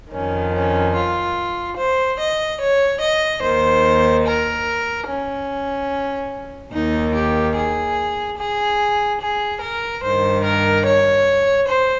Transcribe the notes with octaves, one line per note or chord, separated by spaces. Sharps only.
F2 D#3 C#4
C#4
F4
C5
D#5
C#5
D#5
D#2 D#3 C5
A#4
C#4
D#2 D#3 D#4
G4
G#4
G#4
G#4
A#4
G2 D#3 C5
A#4
C#5
C5